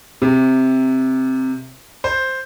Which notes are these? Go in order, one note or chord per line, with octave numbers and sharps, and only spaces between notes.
C3
C5